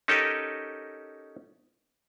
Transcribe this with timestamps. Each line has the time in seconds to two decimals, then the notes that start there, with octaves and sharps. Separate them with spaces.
0.08 C#4 D#4 G4 A4 A#4 D#5